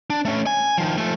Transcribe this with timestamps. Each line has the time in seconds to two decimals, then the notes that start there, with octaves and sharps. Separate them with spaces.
0.10 D4
0.25 A3 C#4
0.47 G#5
0.78 D#3 F3
0.97 F3 A3